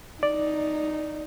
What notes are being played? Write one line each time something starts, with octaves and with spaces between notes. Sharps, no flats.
D#4 D5